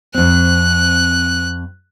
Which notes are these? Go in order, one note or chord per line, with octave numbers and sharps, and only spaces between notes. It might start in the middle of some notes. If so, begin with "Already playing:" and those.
F2 C4 F#6